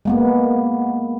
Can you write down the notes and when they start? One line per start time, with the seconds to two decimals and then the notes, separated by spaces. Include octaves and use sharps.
0.05 G#3 A#3 B3